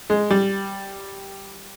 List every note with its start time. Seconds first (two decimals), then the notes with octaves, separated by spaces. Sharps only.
0.10 G#3
0.31 G3